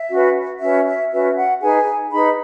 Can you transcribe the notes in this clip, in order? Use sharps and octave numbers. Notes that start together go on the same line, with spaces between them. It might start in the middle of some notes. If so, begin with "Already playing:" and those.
Already playing: E5
C#4 F#4 B4
C#4 F#4 B4 E5
E5
C#4 F#4 B4 E5
F#5
D#4 G#4 B4 G#5
D#4 G#4 B4 B5